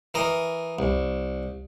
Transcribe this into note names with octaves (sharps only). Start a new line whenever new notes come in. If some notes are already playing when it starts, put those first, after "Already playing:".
E3 A#4 D#5
C2